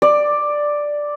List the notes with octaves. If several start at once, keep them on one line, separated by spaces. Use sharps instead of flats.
D5